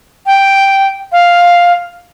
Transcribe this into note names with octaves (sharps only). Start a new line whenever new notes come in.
G5
F5